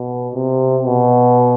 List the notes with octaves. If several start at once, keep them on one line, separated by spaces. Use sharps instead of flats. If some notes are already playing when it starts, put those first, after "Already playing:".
Already playing: B2
C3
B2